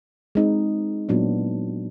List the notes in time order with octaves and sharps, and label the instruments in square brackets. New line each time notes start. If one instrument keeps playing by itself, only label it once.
[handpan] G#3 C4 D#4
A#2 F#3 B3 D4